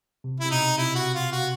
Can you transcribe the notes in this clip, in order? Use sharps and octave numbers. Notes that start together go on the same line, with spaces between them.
C3
C3 E4
B2 D#4
C3 E4
F#4
F4
F#4